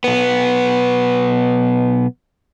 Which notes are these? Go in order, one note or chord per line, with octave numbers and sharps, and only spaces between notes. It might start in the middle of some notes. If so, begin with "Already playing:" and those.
B1 B3